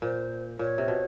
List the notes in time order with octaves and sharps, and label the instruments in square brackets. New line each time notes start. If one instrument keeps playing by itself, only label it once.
[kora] A#2 [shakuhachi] C5
[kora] A#2 [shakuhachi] C#5
[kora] C3
B2